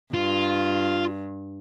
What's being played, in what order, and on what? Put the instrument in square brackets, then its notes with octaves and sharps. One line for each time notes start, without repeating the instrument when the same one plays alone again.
[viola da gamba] G2 [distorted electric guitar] F4